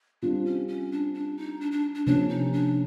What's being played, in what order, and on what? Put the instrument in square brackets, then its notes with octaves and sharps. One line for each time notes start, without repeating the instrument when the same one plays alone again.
[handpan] G3 C4 F4 [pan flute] D4
[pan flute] C#4
C#4
D4
D4
D#4
D4
D4
D4
[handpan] C3 F3 A#3 C#4 [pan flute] D4
[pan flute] D#4
D4